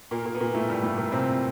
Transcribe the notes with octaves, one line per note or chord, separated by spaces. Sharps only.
A#2 A#3
A#2 A#3
B3
A#2 A#3
A2 A3
G2 G3
A2 A3
A#2 A#3
C3 C4